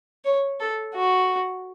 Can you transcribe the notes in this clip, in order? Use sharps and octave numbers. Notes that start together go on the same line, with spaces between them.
C#5
A4
F#4